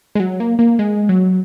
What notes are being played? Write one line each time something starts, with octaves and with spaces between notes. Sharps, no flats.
G#3
F#3
A#3
A#3
G#3
F#3